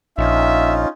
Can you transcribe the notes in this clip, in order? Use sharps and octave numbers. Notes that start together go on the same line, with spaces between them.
A#1 C#4 D#4 F4 E5